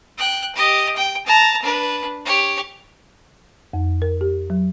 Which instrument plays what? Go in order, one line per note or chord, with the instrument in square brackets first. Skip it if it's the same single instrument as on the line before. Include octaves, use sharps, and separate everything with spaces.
[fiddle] G5 F#6
G4 D#5
G5
A5 A#5
D4 B4
G4 C#5
[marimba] F2
A#4
G4
F#3